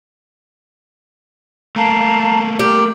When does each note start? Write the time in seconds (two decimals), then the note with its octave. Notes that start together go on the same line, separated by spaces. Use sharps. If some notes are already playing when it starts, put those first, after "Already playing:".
1.76 A3 A#3 F5 A5 A#5
2.59 G4 A#4